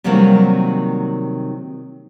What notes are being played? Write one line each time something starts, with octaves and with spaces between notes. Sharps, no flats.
C3 D#3 F#3 G3 A#3 C4